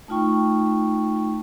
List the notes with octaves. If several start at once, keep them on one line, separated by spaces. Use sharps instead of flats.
A3 D#4 F4 G5 C#6